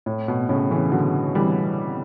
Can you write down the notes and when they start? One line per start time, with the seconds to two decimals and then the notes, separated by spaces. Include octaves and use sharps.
0.06 A2
0.28 B2
0.49 A2 C#3
0.71 C#3 E3
0.92 D3 F#3
1.35 E3 G3